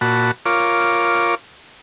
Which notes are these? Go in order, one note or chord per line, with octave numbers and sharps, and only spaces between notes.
A#2 F#4 A5 B5
F4 A#4 C#5 D6